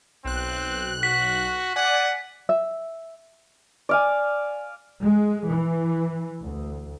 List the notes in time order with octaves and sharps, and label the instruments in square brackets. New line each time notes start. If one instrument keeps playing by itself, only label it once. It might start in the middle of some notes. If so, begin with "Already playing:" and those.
[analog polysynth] B1 F#6 [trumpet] C4
[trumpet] F#4 [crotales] B6
[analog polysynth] D5 G#5 [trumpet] F#5
[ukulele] E5
[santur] D5 F5 G#5
[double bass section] G#3
E3
D2